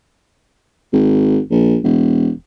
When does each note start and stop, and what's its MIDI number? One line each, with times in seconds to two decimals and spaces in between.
0.93 1.39 32
1.51 1.77 34
1.84 2.30 28